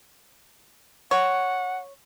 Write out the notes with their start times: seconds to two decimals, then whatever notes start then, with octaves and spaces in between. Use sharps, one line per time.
1.11 C#5 F#5